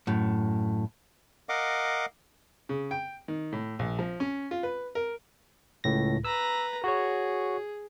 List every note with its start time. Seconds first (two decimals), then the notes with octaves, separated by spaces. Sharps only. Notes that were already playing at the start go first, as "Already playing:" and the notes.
0.07 F#2 A2
1.49 A#4 D#5 F5 F#5 D6
2.69 C#3
2.91 G5
3.28 D#3
3.52 A2
3.79 A#1
3.99 F3
4.20 C#4
4.51 F4
4.63 B4
4.95 A#4
5.84 C#2 A2 A#6
6.25 B4 A#5 E6
6.84 F#4 G#4 C#5